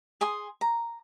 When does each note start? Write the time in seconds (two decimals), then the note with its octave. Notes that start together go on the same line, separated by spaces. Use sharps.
0.21 G#4 G#5 C6 D#6
0.61 A#5